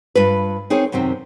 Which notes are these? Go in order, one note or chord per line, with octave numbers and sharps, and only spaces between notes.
G2 F4 B4
C4 D#4 G#4 A#4 C#5
F#2 C3 D#3 C4